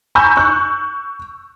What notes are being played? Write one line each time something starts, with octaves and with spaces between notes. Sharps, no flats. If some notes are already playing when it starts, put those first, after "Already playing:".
G#5 A#5 B5 C#6 E6 G6
C#6 F#6